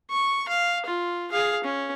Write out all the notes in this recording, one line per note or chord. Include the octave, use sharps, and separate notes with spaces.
C#6
F5
F4
G#4 F5
C#4